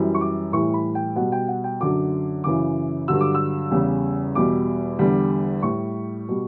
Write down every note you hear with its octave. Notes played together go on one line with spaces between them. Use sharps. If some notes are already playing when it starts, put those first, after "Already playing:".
Already playing: F#2 E3 G3
C#6
D6
A2 E3 G3 C#6
B5
G5
B2 G3 F#5
G5
F#5
G5
F#2 D3 F#3 D6
F#2 C#3 E3 D6
G2 D3 F#3 E6
D6
E6
E2 C#3 G3
E2 B2 G3 D6
E2 D3 G3
A2 G3 C#6
B2 G3